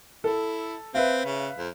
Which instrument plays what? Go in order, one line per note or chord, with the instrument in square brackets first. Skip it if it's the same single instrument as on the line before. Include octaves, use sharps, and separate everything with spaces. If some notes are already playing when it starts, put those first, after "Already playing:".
[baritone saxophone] E4 [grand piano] A4
[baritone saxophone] C4 [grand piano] B4 E5 F5
[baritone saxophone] C#3
F2